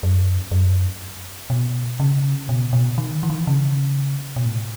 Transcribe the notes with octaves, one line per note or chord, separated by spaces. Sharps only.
F#2
F#2
B2
C#3
B2
B2
D#3
E3
D#3
E3
C#3
B2
A2